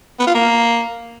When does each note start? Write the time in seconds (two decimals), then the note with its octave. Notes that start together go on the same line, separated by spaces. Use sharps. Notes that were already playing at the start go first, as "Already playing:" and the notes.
0.19 B3
0.27 F4
0.34 A#3